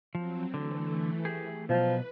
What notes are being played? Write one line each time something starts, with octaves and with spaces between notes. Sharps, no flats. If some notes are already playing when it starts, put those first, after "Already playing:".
F3 F#3 C4
D3 E3 A3
G4 G#4
B2 F3 F#3 B4